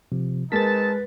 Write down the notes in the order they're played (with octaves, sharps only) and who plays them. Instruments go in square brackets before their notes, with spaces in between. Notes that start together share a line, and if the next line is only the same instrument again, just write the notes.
[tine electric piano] C3 F3
[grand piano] G#3 A#4 [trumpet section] C4 D#4 A5 [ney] B4 [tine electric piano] A6 B6